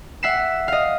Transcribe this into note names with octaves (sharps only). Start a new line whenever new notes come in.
E5 F#5 B6 C7 E7
D#5 F5